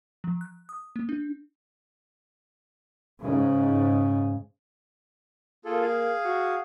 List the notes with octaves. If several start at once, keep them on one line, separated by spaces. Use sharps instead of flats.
F3
F#6
D#6
A#3
D4
G#2 C#3
A#3 F4 G#4 A4
G#4 F5
F#4